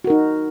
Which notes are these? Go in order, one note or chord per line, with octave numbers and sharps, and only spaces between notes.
D#4 F#4 A#4